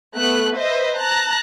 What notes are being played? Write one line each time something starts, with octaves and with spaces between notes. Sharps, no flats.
A3 B3 F#6
B4 C5 D#5 E5
A5 A#5 F#6